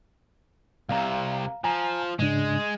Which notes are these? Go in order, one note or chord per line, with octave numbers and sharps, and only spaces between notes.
C2 C3 F5 A#5
F3 G#5 A#5
G#2 C#3 G#3 D4